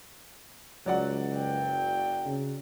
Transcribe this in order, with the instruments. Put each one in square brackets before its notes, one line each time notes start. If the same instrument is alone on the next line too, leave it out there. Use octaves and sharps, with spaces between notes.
[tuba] C#2 [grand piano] F#3 D5 F#5
[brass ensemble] F#1 G5
[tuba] C#3